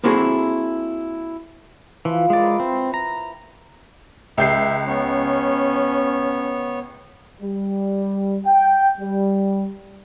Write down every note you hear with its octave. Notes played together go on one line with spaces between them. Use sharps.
A#3 C4 E4 F#4 G#4 A4
E3 F3 B4
G#3 E4 A#4 D5
B4 C#5
C4
A#5
C#2 E5 G6 C7
B3 C#4 C#5
G3
G5
G3